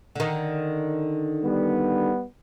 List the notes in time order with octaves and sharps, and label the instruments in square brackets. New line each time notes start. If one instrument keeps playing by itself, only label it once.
[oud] D3 D#3
[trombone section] G3 B3